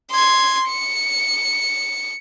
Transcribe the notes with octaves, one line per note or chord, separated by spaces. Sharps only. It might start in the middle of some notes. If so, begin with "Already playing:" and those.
C6 G#6
C#7